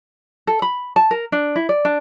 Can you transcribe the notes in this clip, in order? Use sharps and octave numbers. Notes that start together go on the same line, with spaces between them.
A4
B5
A5
A#4
D4
E4
D5
D4